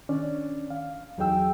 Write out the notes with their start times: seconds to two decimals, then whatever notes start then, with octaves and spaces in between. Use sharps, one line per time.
0.09 D#3 C#4 D4 D5
0.70 F5
1.18 E2 F#3 D#4 G#4 G5 E6